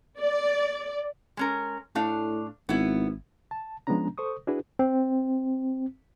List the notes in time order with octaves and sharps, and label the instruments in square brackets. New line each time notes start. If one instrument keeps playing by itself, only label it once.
[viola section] D5
[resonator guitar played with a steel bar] G#3 C#4 A#4
[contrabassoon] A2 [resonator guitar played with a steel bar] A3 D4 F5
[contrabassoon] G#1 [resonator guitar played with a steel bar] B3 E4
[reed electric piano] A5
F3 G#3 B3 C#4 D4 A#5
A4 C5 C#6 D#6
D4 E4 F#4 G#4 B4
[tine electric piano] C4